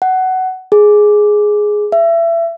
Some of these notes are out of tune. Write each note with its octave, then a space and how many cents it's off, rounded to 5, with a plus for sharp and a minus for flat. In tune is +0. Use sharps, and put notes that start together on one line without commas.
F#5 +15
G#4 +5
E5 +25